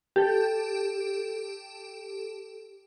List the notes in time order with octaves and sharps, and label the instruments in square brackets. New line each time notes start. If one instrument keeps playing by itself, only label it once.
[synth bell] G4 A4